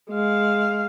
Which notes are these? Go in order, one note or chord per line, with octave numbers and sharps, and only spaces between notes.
G#3 F5